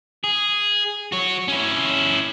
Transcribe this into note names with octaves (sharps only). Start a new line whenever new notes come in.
G#4
F#4 C#5
C#4 E4